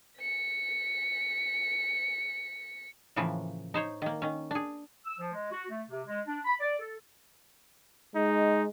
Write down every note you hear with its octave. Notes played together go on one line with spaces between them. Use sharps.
B6 C#7
A2 C#3 E3 F3 A#3
D#4 C5 C#5
D#3 A#3
D#3 C#4
D4 G#4
E6
F3
G#3
F#4
A3
C3
G#3
D4
B5
D5
A4
G#3 D#4